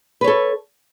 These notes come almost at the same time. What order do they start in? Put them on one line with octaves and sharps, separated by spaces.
B4 C#5 A4